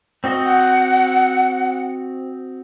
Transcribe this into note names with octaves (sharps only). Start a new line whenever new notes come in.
C4 F#4 D#5
F#5